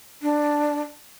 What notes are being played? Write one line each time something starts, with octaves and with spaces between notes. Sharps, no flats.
D4